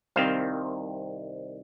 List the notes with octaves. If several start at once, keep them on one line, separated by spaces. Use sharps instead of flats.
C2 C3 D#3 C4 C5 F5